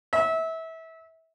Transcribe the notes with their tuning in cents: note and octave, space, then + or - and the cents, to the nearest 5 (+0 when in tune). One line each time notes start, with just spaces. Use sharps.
E5 -25